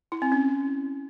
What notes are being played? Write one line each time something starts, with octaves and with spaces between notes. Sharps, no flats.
E4
C4
C#4